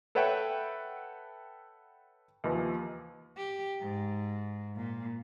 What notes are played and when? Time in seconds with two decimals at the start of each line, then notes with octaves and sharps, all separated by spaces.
0.15 A4 B4 C#5 E5 F#5 G5
2.44 D#2 E3 F3
3.38 G4
3.81 G#2
4.76 A#2